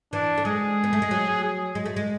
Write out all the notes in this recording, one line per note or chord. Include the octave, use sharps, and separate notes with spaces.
E3 D4
A3
G#3 G#4
B3
A3
G#3
F#3
G#4
G#3
A3
G#3